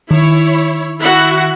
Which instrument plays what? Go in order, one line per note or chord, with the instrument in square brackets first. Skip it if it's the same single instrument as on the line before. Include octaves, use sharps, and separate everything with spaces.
[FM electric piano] D#3 [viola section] E4 C#5
[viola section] E4 F#4 F#5